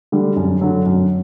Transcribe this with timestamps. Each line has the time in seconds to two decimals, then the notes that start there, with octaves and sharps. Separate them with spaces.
0.12 D3 G3
0.36 F#2
0.61 D3 F#3
0.86 F#2